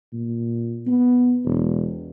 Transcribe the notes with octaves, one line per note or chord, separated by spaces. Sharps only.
A#2
B3
E1